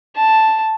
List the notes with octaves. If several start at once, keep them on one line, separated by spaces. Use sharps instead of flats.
A5